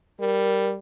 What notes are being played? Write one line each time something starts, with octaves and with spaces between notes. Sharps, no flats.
G3 A#4